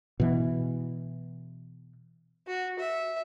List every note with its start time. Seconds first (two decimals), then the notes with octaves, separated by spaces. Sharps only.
0.20 B2 E3
2.47 F#4
2.79 E5